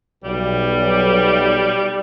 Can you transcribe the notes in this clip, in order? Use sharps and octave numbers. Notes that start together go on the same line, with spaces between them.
B1 G3